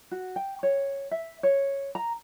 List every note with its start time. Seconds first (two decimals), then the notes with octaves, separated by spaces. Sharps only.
0.11 F#4
0.36 G5
0.63 C#5
1.11 E5
1.43 C#5
1.95 A#5